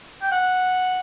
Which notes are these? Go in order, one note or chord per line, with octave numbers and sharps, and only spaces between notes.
G5
F#5